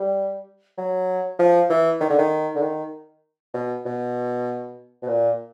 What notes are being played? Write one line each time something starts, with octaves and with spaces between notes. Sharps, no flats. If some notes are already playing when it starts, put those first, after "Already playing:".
Already playing: G3
F#3
F3
E3
D#3
D3
D#3
D3
D#3
B2
B2
B2
A#2